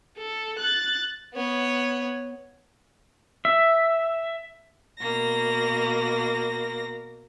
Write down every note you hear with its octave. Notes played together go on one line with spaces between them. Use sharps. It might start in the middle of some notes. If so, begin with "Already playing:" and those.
A4
F#6 A6
B3 C#5
E5
B2 A#3 A#6